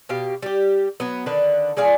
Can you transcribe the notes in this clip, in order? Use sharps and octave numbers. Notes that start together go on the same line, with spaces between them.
B2 G4 F5
G3 G4
F#3 B3
D3 D#3 D4 B4
G#3 G#4 D5 F5